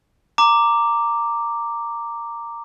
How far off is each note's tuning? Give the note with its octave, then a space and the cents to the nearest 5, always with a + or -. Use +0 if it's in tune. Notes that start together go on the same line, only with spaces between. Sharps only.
A#5 -10 D6 +0